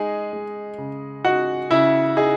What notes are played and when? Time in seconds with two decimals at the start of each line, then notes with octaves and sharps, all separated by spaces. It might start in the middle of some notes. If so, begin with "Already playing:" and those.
Already playing: G#3 D#4 G#4
0.33 G#3
0.78 C#3
1.25 D#4 F#4 F#5
1.71 C#3 E4 E5
2.17 D#4 G#4